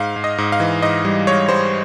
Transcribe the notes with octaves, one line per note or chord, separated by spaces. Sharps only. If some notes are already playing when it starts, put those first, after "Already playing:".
Already playing: G#2 F5
G#2
D#5
G#2
F5
E3
G#2 D#5
G3
G#2 C#5
G3 C5